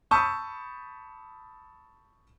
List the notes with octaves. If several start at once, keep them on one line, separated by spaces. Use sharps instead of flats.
A5 B5 C#6 D#6 E6 G6